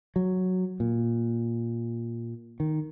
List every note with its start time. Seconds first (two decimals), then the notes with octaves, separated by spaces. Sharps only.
0.16 F#3
0.80 A#2
2.60 D#3